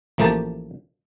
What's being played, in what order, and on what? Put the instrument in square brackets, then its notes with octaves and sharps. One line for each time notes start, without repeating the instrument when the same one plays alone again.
[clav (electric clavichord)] A1 F3 A3 A#3 G4 A5